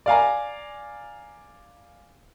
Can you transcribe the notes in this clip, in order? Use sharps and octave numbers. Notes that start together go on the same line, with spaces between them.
D5 F5 G#5 A#5